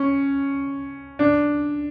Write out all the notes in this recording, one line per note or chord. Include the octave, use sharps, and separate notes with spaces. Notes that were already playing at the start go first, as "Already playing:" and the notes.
Already playing: C#4
D4